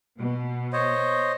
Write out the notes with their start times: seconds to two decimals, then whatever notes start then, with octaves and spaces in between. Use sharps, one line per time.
0.18 B2
0.73 C5 C#5 D#5